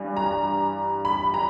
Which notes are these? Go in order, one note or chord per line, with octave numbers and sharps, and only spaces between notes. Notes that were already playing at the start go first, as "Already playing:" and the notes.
Already playing: G2 E3 G3
A#5
B5
A#5